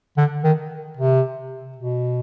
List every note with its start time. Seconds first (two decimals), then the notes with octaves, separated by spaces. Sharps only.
0.17 D3
0.44 D#3
0.97 C3
1.76 B2